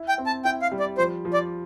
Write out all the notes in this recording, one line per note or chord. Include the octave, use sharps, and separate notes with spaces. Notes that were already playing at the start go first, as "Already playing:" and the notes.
Already playing: E4
G5
C4
A5
E4 G5
F5
G3
D5
F3 C5
F3
D5